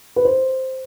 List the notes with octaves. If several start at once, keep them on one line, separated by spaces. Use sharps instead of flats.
B4
C5